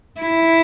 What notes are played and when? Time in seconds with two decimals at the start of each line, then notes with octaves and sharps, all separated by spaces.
0.21 E4